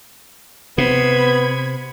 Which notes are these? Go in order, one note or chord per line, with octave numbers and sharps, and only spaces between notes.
C3 B3 B5 G#6